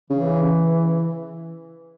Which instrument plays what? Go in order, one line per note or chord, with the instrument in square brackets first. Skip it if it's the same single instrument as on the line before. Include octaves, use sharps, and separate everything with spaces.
[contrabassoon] C#3 [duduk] E3